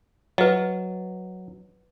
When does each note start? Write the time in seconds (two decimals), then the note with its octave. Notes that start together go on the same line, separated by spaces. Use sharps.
0.38 F#3 B4 D#5